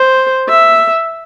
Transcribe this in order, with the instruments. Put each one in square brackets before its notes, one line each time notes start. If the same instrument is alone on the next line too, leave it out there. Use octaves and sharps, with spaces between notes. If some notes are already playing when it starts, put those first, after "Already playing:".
Already playing: [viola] C5
E5